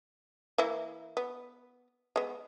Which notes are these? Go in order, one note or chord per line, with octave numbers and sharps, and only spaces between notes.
E3 A#3 E4
B3
G#3 B3